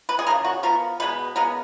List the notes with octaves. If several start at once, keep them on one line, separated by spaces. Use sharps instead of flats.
B4
G#4
C#3 F3 A#3 A#4
F#4
F3 B3 A#4
B2 G#3 B3 B4
C#3 G#3 B3 A#4